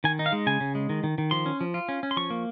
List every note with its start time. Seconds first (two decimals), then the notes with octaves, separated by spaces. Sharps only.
0.04 D#3 G#5
0.19 D#4
0.26 F5
0.33 G#3
0.47 C#3 G#5
0.60 C#3
0.75 G#3
0.90 D#3
1.04 D#3
1.18 D#3
1.31 F3 C6
1.46 C#4
1.61 F3
1.74 F4
1.89 C#4
2.03 C#4
2.11 C6
2.17 F3 C#6
2.30 A#3